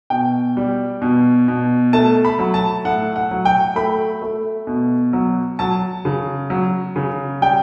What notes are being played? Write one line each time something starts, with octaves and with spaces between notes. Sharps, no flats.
B2 G5
G3
B2
B2
A3 A5
B5
F#3
A5
A2 F#5
F#5
F#3
G5
A3 B5
A3
B2
F#3
F#3 A5
C#3
F#3
C#3
G3 G5